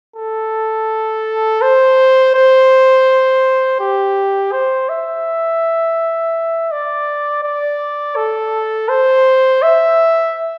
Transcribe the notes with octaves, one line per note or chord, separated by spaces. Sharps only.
A4
C5
C5
G4
C5
E5
D5
D5
A4
C5
E5